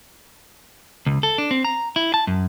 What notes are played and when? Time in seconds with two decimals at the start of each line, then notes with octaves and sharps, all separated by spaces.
1.06 C#2
1.23 A4
1.38 D4
1.51 C4
1.65 A#5
1.96 E4
2.14 A5
2.27 F#2